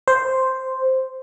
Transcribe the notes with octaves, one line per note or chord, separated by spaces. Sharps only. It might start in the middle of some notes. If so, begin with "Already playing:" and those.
C5